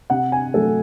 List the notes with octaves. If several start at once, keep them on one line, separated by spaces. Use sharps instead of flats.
C3 F#5
G#5
F#3 A3 A4